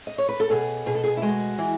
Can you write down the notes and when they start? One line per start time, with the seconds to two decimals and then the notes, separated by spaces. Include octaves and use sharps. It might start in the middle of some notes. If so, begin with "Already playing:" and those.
0.07 D#5
0.18 C#5
0.29 B4
0.40 A4
0.50 B2 G#4
0.86 B2 G#4
0.95 A4
1.04 G#4
1.17 E4
1.22 G#3 F#4
1.58 E3